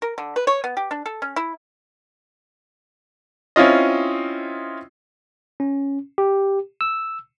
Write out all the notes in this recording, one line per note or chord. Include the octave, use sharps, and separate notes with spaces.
A#4
D3
B4
C#5
B3
G4
D4
A4
C#4
E4
C4 C#4 E4 F4 D#5
C#4
G4
E6